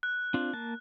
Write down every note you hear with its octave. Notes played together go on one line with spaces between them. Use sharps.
F#6
C4 D4 F4
A#3 A5